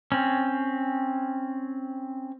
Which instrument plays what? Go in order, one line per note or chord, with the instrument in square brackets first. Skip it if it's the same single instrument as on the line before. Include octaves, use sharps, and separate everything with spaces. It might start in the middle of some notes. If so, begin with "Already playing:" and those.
[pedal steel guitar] C4 C#4